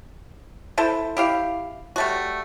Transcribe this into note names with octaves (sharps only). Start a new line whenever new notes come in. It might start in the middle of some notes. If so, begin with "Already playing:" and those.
E4 A4 C5
E4 G4 F5
G3 A3 F#4